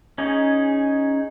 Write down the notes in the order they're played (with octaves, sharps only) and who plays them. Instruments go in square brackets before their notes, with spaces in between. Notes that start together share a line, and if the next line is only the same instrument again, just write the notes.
[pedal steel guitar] C#4 D#4 G#4